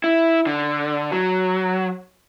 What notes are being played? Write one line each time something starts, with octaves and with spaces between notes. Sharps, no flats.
E4
D3
F#3